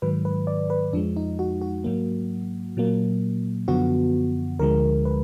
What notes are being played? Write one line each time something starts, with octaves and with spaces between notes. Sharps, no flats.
G#2 D#3 F#3 B4
B4
D5
B4
F2 F3 G#3 D4
D#4
F#4
F#4
G#2 F#3 A#3
A#2 F#3 A#3
F#2 D3 F3 B3 F#4
D2 D3 F3 G#3 A#4
B4